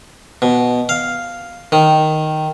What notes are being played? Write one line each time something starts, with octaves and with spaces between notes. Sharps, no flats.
B2
F5
D#3